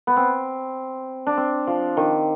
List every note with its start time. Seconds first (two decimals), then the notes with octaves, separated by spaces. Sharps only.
0.07 B3
0.17 C4
1.27 D4
1.37 C4
1.67 F3
1.97 D#3